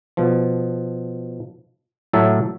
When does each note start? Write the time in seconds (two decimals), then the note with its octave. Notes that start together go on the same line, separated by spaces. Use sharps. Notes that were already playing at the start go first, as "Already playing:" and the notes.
0.17 B2 F3
2.13 A2 F#3 E5 A5